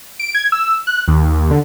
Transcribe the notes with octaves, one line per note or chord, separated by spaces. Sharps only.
D7
G#6
E6
F#6
D#2
D3